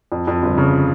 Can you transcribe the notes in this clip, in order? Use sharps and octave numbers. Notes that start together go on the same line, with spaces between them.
F2
F2
G1
C#3